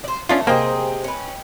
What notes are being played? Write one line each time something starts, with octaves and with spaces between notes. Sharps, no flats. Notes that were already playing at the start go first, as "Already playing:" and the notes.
C5 D5
A3 B3 C#4 D4 F4
C3 A#3 G#4 C5 D#5 G5 G#5
C#4 B4